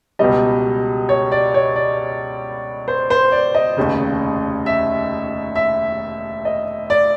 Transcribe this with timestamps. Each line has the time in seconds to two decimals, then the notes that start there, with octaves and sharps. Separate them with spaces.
0.19 C#2 B2 G3 D#5
1.09 C#5
1.32 D5
1.54 C#5
1.76 D5
2.88 C5
3.10 C5
3.32 D5
3.55 D#5
3.77 F1 D#2 C#3
4.66 E5
5.56 E5
6.45 D#5
6.90 D5